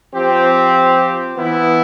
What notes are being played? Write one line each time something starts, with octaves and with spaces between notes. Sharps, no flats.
F3 C4 G4
E3 B3 E4